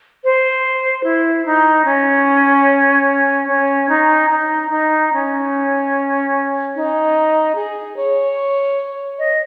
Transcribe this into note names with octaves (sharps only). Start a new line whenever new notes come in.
C5
E4
D#4
C#4
C#4
D#4
D#4
D#4
C#4
D#4
G#4
C#5
D#5